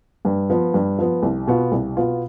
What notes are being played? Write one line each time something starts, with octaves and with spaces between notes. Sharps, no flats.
G2
F3 B3
G2
F3 B3
C2
B2 B3 F4
C2
B2 B3 F4